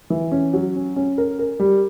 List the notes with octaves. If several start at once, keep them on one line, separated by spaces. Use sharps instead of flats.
E3
C#4
F#3
C#4
C#4
A#4
A#4
G3